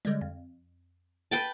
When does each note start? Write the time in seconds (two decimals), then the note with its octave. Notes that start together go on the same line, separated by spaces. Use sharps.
0.05 D3 G3 G#3
0.21 F2
1.31 B4 G5 A5